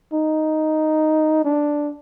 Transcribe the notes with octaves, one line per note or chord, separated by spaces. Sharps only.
D#4
D4